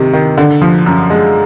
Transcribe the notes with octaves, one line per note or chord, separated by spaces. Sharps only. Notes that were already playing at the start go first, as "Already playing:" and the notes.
Already playing: C3 D#3
D#3
D3
F3
F#2
G#3